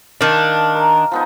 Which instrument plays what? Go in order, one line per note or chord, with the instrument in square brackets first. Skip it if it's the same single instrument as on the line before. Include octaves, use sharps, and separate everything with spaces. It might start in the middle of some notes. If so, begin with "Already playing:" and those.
[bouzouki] D#3 D4 [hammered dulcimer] F5 A5
[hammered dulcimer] A#4
F3 B3 D#4